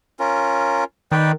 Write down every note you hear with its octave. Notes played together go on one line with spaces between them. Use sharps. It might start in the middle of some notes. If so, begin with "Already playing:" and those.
C#4 F4 A#4
D#3 B4 D5 G5